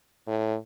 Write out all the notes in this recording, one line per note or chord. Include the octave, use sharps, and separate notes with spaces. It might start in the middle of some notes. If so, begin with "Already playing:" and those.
A2